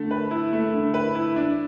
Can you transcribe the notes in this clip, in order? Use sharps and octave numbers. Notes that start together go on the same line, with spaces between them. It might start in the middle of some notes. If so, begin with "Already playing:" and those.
Already playing: D3 A3
B4
E4
A3
D3
B4
E4
D4